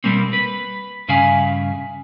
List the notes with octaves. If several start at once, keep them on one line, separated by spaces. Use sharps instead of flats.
B2 G3 A#3 C4
B4
G2 C#3 E5 F5 G#5